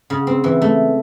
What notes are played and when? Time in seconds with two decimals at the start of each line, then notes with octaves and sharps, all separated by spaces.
0.10 C#3
0.27 C4
0.44 E3
0.62 A3